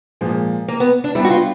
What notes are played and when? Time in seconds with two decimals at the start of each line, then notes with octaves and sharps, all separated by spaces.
0.21 A#2 F3 G#3
0.68 A#3
0.80 B3
1.04 D4
1.15 G3 B3 D4 E4
1.24 F#4
1.30 F4